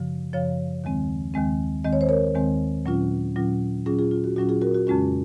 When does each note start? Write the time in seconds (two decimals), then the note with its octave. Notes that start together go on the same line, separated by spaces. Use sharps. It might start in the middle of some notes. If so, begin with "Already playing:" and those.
Already playing: F#2 C#3 F3
0.33 F#2 C#3 F3 C#5 F5
0.84 D#2 D#3 G#3 C4
1.34 D#2 D#3 G#3 C4
1.84 D#2 D#3 G#3 C4 D#5
1.93 C#5
2.01 C5
2.09 A#4 C#5
2.35 D#2 D#3 G#3 C4
2.85 A#2 F#3 C#4 F4
3.36 A#2 F#3 C#4 F4
3.86 A#2 F#3 C#4 F4 G#4
3.99 F4 G#4
4.11 F4
4.24 F#4
4.36 A#2 F#3 C#4 F4 F#4
4.49 F4 G#4
4.61 F#4 A#4
4.75 F#4
4.87 F2 C#3 G#3 C#4 F4 F#4